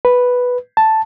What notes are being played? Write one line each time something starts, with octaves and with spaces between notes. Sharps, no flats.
B4
A5